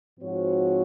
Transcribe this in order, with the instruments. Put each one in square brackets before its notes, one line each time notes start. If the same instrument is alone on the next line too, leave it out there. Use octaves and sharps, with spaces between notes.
[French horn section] G#2 F3 C4 F#4 C#5